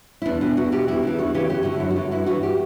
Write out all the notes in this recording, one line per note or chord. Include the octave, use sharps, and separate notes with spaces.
E4
E2 D4
B2
E2 F#4
B2 G4
E2 E4
C#3 E3 D4
E2 F#4
C#3 E3 G4
F#2 G4
D3 F#4
F#2 E4
F#4
D3
G2 E4
E3 F#4
G4